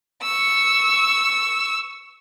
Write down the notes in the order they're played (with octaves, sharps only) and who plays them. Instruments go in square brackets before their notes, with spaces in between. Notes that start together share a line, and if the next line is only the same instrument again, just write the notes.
[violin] C#6 E6